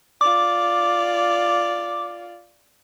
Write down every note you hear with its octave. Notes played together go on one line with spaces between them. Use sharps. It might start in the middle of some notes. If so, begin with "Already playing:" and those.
F4 D5 D6